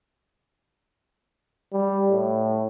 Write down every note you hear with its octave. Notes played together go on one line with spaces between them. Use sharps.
G3
A2